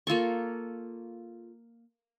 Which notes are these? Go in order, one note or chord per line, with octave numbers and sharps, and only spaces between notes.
A#3 F4 A4 C#6